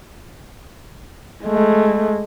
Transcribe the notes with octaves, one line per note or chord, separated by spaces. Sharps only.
G#3 A3